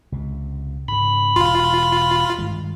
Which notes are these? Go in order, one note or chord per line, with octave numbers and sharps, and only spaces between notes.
C#2 C3
G#2 C#3 B5
E1 F4 C6
G2 D#3 G#3